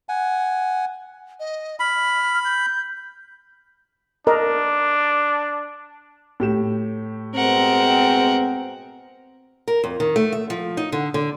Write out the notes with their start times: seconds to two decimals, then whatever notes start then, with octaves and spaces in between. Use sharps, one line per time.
0.09 F#5 G#5
1.40 D#5
1.80 B5 F6
2.45 G6
4.27 D4 A#4 D#5
6.40 A2 G4 E7
7.35 B2 G#3 C4 A#4 F#5
9.68 A#4
9.84 F2
10.00 D#3
10.16 A3
10.32 E5
10.50 F3
10.77 D#4
10.92 D3
11.14 D3